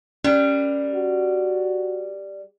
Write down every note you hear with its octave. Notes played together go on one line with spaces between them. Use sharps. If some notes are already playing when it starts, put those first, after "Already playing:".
G3 C#4 A#4
F#4